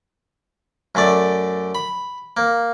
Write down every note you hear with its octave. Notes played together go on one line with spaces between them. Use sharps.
F#2 A3 D5
B5
A#3